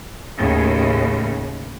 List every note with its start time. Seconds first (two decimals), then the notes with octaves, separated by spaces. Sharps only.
0.38 D#2 A2 C#3